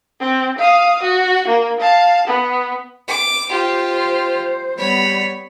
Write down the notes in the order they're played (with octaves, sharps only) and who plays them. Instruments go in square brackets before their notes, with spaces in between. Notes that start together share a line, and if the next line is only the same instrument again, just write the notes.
[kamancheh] C4
F5 D#6
F#4
A#3
F5 A5
B3
[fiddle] D6
[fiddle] F4 G4 [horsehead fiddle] C5
[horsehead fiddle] G3 B3 [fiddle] C#5 B5